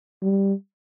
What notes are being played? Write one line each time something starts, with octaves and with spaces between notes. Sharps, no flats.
G3